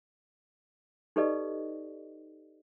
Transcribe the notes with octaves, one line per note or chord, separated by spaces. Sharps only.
D#4 G4 A4 B4 D5 D#5